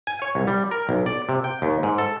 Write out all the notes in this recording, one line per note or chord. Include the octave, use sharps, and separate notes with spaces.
G#5
C#5
C2
G3
A#4
B1
D5
C3
G5
D#2
G#2
A4